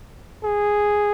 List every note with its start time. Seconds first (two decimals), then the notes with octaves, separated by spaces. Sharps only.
0.44 G#4